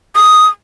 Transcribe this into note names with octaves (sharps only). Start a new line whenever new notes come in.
D#6